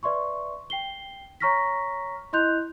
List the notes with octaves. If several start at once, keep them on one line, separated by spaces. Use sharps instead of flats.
B4 D5 E5 C6 C#6
G5 C7 G7
C#5 A#5 C#6 F6 A#6 B6
E4 D#5 C6 F#6 G6 F7